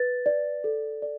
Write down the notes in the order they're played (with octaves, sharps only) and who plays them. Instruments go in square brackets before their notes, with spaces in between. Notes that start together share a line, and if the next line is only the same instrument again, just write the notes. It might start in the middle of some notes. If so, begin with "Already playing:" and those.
Already playing: [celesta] B4 A6
D5
A4
D5